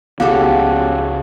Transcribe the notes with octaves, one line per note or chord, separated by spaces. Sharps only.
C#2 C#3 B3 F#4 G4 A4 F5